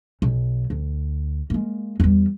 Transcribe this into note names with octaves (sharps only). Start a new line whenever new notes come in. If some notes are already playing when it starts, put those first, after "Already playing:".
B1
D2
G#3 A#3
E2 G3